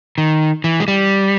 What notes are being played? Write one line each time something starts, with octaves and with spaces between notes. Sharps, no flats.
D#3
E3
G#3
G3